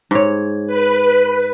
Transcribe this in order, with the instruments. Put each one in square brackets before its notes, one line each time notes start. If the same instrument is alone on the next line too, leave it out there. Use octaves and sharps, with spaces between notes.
[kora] G#2 C#5
[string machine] B4